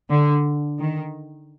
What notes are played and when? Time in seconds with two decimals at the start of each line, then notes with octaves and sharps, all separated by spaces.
0.10 D3
0.79 D#3